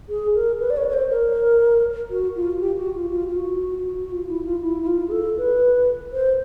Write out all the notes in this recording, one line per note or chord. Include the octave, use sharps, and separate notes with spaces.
G#4
A#4
B4
D5
C#5
C#5
C5
A#4
F#4
F4
G4
F#4
F4
F4
F4
F#4
F#4
F4
E4
F4
E4
E4
F4
G#4
A4
B4
C5